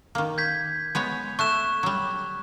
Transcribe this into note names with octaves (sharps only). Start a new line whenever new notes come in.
D#3 A#3
G6 G#6 B6
G#3 B3 C#5
A3 C#6 F#6 E7
F#3 G3